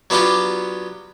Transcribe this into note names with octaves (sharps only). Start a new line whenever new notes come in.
F#3 B3 D4 F4 G4